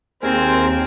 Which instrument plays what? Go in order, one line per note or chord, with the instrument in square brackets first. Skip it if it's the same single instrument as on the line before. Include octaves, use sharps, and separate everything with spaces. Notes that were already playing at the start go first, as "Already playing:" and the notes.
[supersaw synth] D#2 [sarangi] C4 [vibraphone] G#4 C6 [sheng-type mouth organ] A#4 C5 G#5